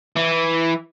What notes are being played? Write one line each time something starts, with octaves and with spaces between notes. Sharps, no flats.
E3